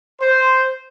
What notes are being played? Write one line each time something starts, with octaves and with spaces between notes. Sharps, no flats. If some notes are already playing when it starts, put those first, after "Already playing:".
C5